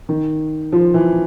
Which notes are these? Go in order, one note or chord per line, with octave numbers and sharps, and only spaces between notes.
D#3
F3
E3